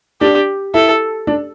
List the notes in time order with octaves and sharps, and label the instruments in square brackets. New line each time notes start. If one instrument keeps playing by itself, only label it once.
[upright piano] D4 [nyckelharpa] G4
[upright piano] E4 [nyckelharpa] A4
[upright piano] D4